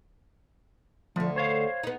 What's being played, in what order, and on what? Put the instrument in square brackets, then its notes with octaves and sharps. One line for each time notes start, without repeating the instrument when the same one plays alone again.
[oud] D2 D3 [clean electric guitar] F3
[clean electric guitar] C5 C#5 F5
[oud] B3 D#4